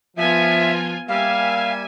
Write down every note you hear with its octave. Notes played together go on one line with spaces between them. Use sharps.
F3 B3 F4 E5 G#5
G3 A#3 E5 F5 G#5